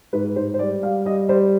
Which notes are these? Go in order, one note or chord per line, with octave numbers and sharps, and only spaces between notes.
G#2 B4
G#2 C5
C5
G3 D5
G3 F5
G3 D#5
G3 C5